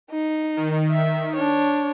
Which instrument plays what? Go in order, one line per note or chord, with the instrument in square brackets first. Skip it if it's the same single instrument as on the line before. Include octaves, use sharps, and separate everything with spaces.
[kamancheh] D#4
[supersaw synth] D#3
[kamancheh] E5
D4 C#5